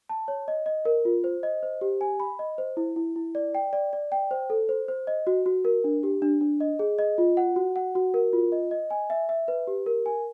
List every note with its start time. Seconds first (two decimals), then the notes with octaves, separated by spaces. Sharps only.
0.09 A5
0.28 C#5
0.48 D#5
0.66 D#5
0.85 A#4
1.05 F4
1.24 C5
1.43 D#5
1.63 C5
1.81 G4
2.01 G#5
2.20 B5
2.39 D#5
2.58 C5
2.77 E4
2.96 E4
3.16 E4
3.35 D5
3.55 G5
3.73 D5
3.93 D5
4.12 G5
4.31 C5
4.50 A4
4.69 C5
4.88 C5
5.07 D#5
5.27 F#4
5.46 F#4
5.65 A#4
5.84 D4
6.03 G4
6.22 D4
6.41 D4
6.60 D#5
6.79 G#4
6.99 D#5
7.18 F4
7.37 F#5
7.56 F#4
7.76 F#5
7.95 F#4
8.14 A#4
8.33 F4
8.52 D#5
8.71 D#5
8.91 G#5
9.10 E5
9.29 E5
9.48 B4
9.67 G4
9.86 A#4
10.06 G#5